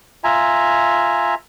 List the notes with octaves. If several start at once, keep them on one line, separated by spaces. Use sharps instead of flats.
F4 E5 G#5 A#5